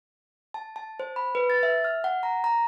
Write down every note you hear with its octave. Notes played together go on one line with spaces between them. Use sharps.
A5
A5
C5
B5
B4
A6
E5
F6
F#5
A#5
A#5